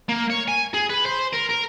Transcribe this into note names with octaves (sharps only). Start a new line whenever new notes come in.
A#3
C#5
G#5
G#4
B4
C5
A#4
A#4